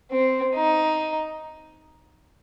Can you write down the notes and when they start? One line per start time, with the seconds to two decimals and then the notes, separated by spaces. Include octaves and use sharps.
0.11 C4
0.55 D#4